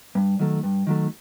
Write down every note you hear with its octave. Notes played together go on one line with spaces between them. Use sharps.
G2
D#3 F#3 A3
G2
D#3 F#3 A3